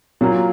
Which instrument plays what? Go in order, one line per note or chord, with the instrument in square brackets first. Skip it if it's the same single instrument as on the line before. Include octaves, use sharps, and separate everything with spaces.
[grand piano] A#2 F#3 A#3 F4